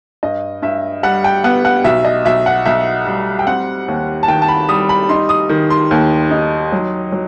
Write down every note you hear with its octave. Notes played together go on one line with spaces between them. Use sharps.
G2 D#5
G2 E5
G3 F#5
G5
B3 F#5
F#5
B1 E5
D#5
B1 E5
F#5
B1 E5
G3
G5
C4 F#5
D#2
A5
D#3 G5
A5
B5
G3 D#6
B5
D#4 C6
D#6
D#3
C6
D#2
D#4
F#3
F#3